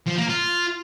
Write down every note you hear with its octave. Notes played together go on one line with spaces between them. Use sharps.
F3
A#3
F4